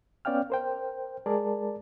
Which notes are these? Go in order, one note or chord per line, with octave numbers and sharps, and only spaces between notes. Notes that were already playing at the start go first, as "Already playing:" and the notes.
B3 C#4 D5 F5 G5 F6
A#4 C5 G5
G#3 G#4 A#4 D5 A5